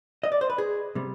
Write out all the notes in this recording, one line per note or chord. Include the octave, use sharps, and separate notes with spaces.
D#5
D5
C5
B4
G#4
C3 G3